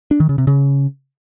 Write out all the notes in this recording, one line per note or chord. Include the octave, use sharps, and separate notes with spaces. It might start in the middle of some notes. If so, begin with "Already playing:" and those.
D4
D#3
C#3
C3
C#3